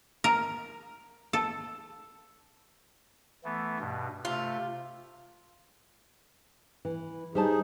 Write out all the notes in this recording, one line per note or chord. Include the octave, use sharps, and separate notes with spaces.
A#4
A4
E3 A3 B3
G2 B2
C3 A3 F4
E3
G3 D#4 G#4 C5 A5